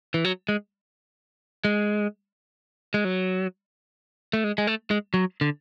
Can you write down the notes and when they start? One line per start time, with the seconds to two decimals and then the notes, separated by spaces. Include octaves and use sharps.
0.14 E3
0.25 F#3
0.49 G#3
1.65 G#3
2.94 G#3
3.05 F#3
4.33 A3
4.44 G#3
4.58 G#3
4.67 A3
4.91 G#3
5.14 F#3
5.41 D3